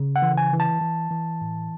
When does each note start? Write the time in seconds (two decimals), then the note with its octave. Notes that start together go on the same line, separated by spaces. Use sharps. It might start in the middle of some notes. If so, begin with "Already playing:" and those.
Already playing: C#3
0.16 F#5
0.22 E3
0.38 G#5
0.53 E3
0.60 A5
0.81 E3
1.11 E3
1.41 A2